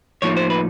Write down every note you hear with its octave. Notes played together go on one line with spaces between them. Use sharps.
A2 F3 A#3 D#4 C#5
C5
B4